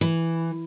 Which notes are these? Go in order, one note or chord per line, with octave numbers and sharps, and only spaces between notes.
E3